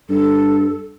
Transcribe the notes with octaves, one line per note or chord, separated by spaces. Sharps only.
G2 A4